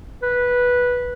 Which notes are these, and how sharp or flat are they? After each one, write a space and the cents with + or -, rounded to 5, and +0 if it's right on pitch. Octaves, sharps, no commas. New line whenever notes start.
B4 -10